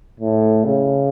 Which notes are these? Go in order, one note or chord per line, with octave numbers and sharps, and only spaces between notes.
A2
C#3